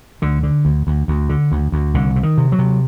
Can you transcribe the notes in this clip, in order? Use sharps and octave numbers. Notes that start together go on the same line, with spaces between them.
D2 D3
D3
D2
D2
D2
D3
D2
D2
C2 D3
C3
D#3
C3
F#3
C3